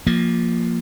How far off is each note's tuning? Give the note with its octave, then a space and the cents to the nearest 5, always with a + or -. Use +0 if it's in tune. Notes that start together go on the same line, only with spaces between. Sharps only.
F3 +0 A#3 +0